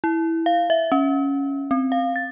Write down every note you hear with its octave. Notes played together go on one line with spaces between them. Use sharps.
E4
F5
E5
C#4
C4
F5
A6